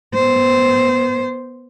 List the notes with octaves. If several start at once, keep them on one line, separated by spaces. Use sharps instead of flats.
B3 C5